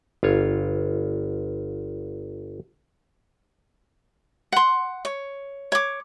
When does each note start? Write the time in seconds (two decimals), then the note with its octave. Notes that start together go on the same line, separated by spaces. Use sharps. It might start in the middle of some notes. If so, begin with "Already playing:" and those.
0.23 G1 F4 C#5
4.52 F#5 C6
5.05 C#5
5.72 C#5 D6